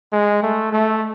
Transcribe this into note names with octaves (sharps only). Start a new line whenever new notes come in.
G#3
A3
A3